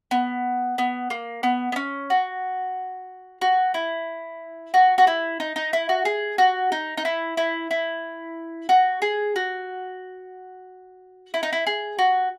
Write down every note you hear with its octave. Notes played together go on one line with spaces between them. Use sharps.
B3
B3
A#3
B3
B3
C#4
F#4
F#4
E4
F#4
F#4
E4
D#4
D#4
E4
F#4
G#4
F#4
D#4
D#4
E4
E4
E4
F#4
G#4
F#4
E4
D#4
E4
G#4
F#4